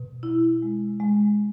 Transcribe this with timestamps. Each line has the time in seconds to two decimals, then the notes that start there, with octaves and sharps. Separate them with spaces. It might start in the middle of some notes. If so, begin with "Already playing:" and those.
Already playing: B2
0.23 E4
0.62 G#3
1.00 G#3